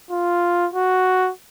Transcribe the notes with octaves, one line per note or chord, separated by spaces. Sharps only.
F4
F#4